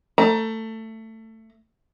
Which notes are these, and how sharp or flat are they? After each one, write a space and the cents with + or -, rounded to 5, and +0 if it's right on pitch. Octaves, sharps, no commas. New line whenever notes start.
A3 +20 A#5 +20